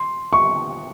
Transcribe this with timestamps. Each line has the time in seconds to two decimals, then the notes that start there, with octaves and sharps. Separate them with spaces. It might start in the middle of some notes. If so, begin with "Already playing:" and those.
Already playing: C6
0.33 C#6